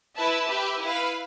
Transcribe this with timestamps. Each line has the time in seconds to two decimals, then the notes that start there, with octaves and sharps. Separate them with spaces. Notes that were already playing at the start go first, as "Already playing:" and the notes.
0.15 E4 B4 E5 A5
0.48 G4 B4 E5
0.80 E4 B4 F5